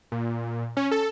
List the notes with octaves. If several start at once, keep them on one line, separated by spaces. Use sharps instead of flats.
A#2
C#4
A4